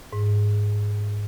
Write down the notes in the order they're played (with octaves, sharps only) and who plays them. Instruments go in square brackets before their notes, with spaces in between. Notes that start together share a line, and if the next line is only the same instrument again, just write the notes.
[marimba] G#2